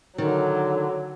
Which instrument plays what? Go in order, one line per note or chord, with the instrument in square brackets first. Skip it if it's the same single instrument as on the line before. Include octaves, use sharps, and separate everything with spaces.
[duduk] D3 [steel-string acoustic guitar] D#3 [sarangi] F#3